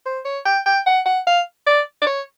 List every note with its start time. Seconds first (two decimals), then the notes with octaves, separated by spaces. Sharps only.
0.06 C5
0.25 C#5
0.45 G5
0.66 G5
0.86 F#5
1.06 F#5
1.27 F5
1.67 D5
2.02 D5
2.07 C#5